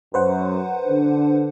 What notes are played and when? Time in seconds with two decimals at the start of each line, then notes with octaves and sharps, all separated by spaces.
0.14 F#2 B4 C5 F#5
0.87 D3 D4